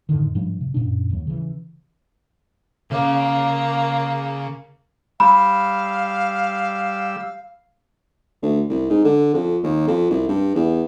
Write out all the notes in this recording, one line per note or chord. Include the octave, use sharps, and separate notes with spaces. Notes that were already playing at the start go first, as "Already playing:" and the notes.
F2 A2 D3 D#3
G#2 F3 G3 D4
C3
F#2 A#2 D4
D#2 F#3
C#3 E3
C#3 A#3
G3 F5 B5 E6
D2
C2
G#2
D3
F2
D#2
F2
C2
G2
E2